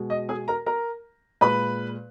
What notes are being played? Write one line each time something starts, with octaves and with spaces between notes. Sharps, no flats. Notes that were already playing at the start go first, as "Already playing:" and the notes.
Already playing: B2 G#3
D#5
G#4 G#5
A#4 A#5
A#4 A#5
A#2 G#3 B4 B5